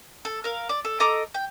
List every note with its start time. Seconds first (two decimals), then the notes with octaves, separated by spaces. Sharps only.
0.25 A4
0.44 A#4 F5
0.69 D5
0.85 A4
1.00 A4 D#5 A#5 D6
1.34 G5